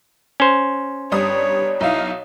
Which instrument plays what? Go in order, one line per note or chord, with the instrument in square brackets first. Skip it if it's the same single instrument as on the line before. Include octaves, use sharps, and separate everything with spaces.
[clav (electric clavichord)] C#4 C5
[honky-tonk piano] G1 G3 D#6 [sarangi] C#5
[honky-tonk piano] B1 E4 F5 [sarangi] D#4